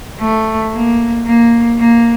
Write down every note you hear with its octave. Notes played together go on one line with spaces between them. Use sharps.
A3
A#3
A#3
A#3